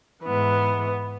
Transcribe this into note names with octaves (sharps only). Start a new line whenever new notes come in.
G#2 E3 B3